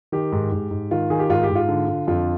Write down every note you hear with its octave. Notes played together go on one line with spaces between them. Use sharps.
D#3 G4
G#2
G#2
G#2
D#3 F4
D#3 G#4
G4
G#2 F4
G4
G#2
F4
D3
D3
F2 F4